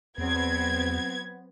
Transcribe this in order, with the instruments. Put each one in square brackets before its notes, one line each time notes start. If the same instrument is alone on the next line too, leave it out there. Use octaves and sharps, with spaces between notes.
[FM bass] E2 [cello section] F#3 C4 [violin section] B3 G#6